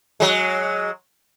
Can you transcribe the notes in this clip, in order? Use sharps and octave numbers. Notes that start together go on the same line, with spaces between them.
F#3 G#3